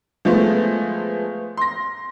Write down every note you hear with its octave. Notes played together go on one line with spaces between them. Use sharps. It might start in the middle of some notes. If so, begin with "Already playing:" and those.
F3 G#3 A3 B3
C6 A#6